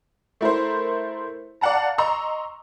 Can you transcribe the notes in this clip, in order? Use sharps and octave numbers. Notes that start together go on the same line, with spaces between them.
A3 E4 A#4 C5
D5 F5 F#5 A5 A#5
D#5 A#5 C6 C#6 E6